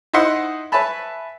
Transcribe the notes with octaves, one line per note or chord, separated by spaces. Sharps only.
D#4 E4 C5 D#5 F#5 C6
B4 C#5 E5 G#5 A5 B5